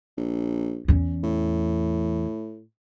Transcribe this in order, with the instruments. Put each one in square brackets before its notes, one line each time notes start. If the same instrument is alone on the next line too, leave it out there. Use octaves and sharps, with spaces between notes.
[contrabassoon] A#1
[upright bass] E2 C#4
[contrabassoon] A2